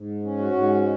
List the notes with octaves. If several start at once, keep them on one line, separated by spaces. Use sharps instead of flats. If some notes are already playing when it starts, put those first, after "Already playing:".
Already playing: G#2
C#4
F#4
G#2
G#3